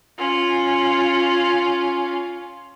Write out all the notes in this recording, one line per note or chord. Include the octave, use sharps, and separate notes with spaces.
C#4 F4